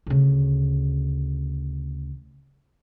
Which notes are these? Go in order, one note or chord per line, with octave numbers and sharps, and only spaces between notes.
D2 C#3